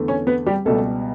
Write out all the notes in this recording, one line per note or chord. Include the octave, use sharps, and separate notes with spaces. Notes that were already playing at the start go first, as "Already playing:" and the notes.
Already playing: E2 D3 A3
C#4 C#5
B3 B4
G3 G4
C#2 B2 G3 A3 A4